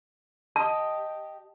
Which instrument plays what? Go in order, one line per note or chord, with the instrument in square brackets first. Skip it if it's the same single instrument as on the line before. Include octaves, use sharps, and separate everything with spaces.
[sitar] G4 D#5 [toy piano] A5